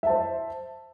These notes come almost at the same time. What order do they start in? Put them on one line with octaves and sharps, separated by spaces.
E5 A5 C5